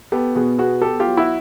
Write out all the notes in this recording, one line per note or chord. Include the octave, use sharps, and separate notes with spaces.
B3 G4 A4
B2 F#4 G#4
B3 F#4 G#4
B3 G4 A4
F4 G4
F#3
E4 F#4